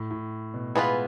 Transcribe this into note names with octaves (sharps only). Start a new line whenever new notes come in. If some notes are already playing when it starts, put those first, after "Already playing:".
Already playing: A2
A2
B2
E3 G#3 B3 F4 B4